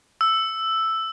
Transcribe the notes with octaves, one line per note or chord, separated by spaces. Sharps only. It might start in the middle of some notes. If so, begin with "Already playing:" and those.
E6